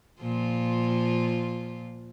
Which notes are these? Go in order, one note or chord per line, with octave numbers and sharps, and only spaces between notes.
A#2 F3 F4